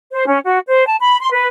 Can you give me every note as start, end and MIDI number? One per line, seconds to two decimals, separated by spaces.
0.11 0.26 72
0.27 0.38 61
0.44 0.58 66
0.66 0.85 72
0.87 0.95 81
0.99 1.18 83
1.20 1.28 84
1.32 1.46 71